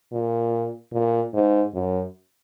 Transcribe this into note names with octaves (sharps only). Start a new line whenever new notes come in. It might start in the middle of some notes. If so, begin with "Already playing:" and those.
A#2
A#2
G#2
F#2